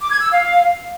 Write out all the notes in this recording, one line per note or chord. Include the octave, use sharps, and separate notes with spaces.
D6
G#6
E6
F5